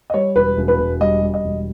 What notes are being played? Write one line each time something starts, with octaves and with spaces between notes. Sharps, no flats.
D#5
G3 C#5
E1 B4
E1
B4
E1
G3 D#5
G3
D#5
E1